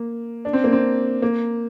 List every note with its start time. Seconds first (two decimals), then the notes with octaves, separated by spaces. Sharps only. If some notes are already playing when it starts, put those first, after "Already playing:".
Already playing: A#3
0.45 D4
0.53 C4
0.64 A#3
0.72 C4
1.22 A#3